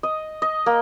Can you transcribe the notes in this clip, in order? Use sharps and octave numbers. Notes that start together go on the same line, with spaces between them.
D#5
D#5
A#3